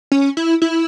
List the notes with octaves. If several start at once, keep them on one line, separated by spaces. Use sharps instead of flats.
C#4
E4
E4